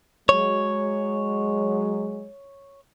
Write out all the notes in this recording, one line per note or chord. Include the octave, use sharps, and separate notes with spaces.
F#3 G#3 C#5